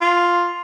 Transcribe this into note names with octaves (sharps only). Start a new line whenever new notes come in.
F4